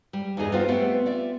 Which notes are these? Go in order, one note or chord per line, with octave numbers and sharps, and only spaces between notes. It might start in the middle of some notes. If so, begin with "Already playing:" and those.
G3
E2 G2 G3 D#4 G#4 D#5
G3 B3 F4 C5
G3 A3 B3 C4
F4 D5 E5